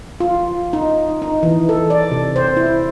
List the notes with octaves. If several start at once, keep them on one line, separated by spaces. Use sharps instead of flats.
F4
D#4
D#4
E3
A4
D5
C3
C5
E4